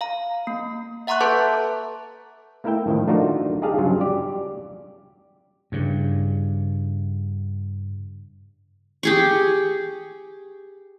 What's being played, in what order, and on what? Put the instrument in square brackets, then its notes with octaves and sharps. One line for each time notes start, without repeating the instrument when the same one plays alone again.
[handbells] F5 A#5
A#3
E5 F#5 A#5 C6 C#6 F#6
A4 B4 E5 A5 D6 G6
[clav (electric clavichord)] A3 A#3 E4 A#4 E5 G5
A2 D#3 F3
A3 D4 D#4 F4 F#4 A#4
D#4 G4 G#4 F5 A5
G2 C#3 F#3 F4
G4 D5
[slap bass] G2 C#3
[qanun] G4 G#4 C#6